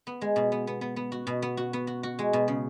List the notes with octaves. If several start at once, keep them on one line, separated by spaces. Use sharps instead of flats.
B3
G#3
B2
B3
B3
B3
B3
F#4
B2
B3
F#4
B3
F#4
F#4
G#3
B2
C#3